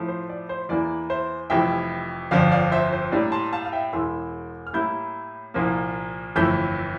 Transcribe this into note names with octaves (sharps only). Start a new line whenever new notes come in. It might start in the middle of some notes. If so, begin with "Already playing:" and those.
Already playing: A2 F3 A3
C5
D5
C5
E2 E3 A#3 D5
C5 E5
F1 F2 E3 G3 E5 G5
G1 F2 D3 F3 D5 F5
D5 F5
C5 E5
C5
A2 G3 A#3 D4 D5
A5 C6
F5 A5
F5
E5 G5
E1 E2 E3 C6 E6
F6
A2 G3 A#3 E4 E6 G6
C2 A#2 F3 A#3
G1 F2 E3 A3 E6 G6